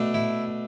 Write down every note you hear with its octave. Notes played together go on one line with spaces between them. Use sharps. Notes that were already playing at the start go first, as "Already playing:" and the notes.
Already playing: B2 A3 D4
E4